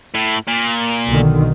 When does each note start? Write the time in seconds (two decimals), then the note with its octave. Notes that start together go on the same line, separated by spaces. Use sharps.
0.15 A2
0.48 A#2
1.09 B1 D3 D#3